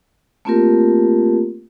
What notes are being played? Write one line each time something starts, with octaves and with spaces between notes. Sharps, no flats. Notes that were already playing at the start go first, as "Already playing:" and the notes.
A3 A#3 C4 F4 G4 A#4